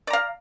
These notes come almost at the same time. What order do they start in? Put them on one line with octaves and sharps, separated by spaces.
D5 A#5 F5